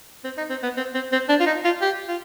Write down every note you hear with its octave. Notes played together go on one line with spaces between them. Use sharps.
C4
D#4
C4
B3
C4
C4
C4
D4
F4
D#4
F4
G4
F4